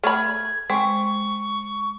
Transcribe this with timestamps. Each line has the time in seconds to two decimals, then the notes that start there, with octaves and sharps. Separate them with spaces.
0.04 A3 B5 F6 G#6
0.70 G#3 C4 C#6